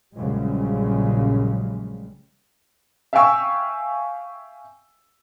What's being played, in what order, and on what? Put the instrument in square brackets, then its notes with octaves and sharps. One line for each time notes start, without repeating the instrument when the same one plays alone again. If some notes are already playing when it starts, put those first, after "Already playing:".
[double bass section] A#1 F#2 C#3 G3 G#3
[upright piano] E5 F5 G5 G#5 C#6 E6